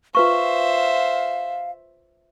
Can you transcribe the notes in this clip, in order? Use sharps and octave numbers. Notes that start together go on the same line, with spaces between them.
F4 B4 C5 E5 F5 C#6